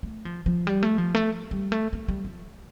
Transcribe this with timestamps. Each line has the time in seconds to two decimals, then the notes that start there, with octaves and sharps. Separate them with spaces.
0.03 A3
0.25 F3
0.46 F3
0.67 G3
0.83 A3
0.98 F3
1.15 A3
1.51 G3
1.72 A3
1.93 A3
2.08 G3
2.25 F3